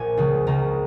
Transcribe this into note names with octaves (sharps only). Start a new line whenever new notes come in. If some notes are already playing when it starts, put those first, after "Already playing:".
Already playing: A#1 A#2 G#5
C#2 C#3 F3 G#3
C#2 C#3 F3 A#3 A#5